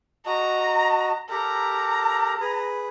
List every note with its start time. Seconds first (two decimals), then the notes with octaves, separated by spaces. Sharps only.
0.26 F#4 D#5 A#5
1.29 G4 A4 A#4 A#5
2.40 G#4 B4